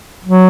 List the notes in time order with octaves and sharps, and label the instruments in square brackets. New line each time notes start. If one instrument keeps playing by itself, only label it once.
[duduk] F#3